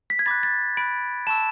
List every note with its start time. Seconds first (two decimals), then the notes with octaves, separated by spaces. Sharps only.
0.10 B6
0.19 G#6
0.26 B5 D6 F#6 A6
0.43 A6
0.77 B5 F#6 D7
1.27 A5 C#6 E6 E7